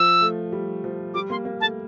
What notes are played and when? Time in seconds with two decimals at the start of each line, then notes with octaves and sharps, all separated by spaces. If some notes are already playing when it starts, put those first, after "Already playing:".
Already playing: F3 E6
0.21 A3
0.52 G3
0.84 F3
1.14 G3 D6
1.30 A#3 C6
1.45 A#3
1.61 A3 A5